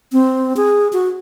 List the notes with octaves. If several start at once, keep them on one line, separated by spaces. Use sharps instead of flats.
C4
G#4
F#4